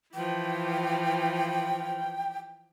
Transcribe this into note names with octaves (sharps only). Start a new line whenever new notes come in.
E3 F3 G5